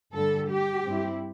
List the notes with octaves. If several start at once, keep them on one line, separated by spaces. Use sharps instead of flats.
G2 D3 G3 A4
G4
G2 G3 C4 E4